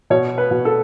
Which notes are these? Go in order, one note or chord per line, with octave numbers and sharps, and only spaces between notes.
B2 C#5
B4
B2
A4